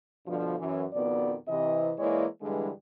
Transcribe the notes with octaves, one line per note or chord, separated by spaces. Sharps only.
G2 B2 D3 F3
F#2 E3
F2 B2 D#3 B3 D5
C3 E3 D#5
E3 G#3 A#3 E4 C#5 D5
G2 D3 E3 G3 G#3